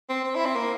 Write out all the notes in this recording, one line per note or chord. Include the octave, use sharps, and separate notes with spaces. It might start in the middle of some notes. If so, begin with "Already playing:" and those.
C4
C4
E4
C4
A#3